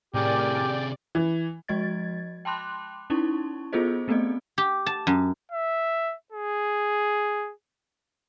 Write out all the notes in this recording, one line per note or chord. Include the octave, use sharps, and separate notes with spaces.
A2 C3 G4 G#4 A#4 D5 G#5
E3
F3 G#3 F#4 D#5 G#6 A6
G5 A5 B5 C6 D6 F#6
C#4 D#4 E4 A5 C6 C#6
B3 F4 G#4 A4 C5 D#5
A3 B3 C4 A4 D5 D#5
G4
A5
F#2
E5
G#4